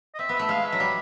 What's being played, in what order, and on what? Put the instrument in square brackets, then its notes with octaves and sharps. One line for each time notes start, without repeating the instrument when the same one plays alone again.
[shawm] D#5
[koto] C4 [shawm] E5
[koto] B3 [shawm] E5
[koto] A3
[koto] G#3 [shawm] F5
[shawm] E5
[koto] F#3
G3